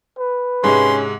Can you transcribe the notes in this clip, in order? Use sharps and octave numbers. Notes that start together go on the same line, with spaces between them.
B4
G#2 C3 G#3 C#4 C6